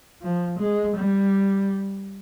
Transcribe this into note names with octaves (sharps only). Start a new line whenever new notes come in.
F3
G#3
G3